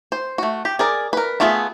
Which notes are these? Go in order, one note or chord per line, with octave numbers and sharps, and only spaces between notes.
C5
A3 F#4
G4
G#4 A#4 D5
A#4 B4
A3 B3 F4 G#4 E5